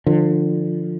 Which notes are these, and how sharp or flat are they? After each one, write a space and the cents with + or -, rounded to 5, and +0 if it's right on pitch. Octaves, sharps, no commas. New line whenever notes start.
D3 +25 F3 +0